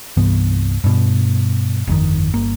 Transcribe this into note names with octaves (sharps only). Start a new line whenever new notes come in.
C2 G2 E3 B3
G2 B2
G1 F2 C3 D#3
G1 A#3